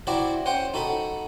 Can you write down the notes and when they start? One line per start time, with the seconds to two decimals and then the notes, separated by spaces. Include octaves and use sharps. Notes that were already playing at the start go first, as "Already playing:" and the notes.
0.07 C4 E4 F#4 D5 E5 A#5
0.46 C#4 C5 F#5 G5
0.74 D#4 F#4 A4 B5